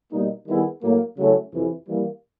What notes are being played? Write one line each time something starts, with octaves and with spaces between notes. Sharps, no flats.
B2 G3 A#3 D#4
D#3 G3 B3 E4 G#4
A2 F#3 A#3
C#3 F#3 A3 C#4 E4
F2 C3 E3
E3 G3 A#3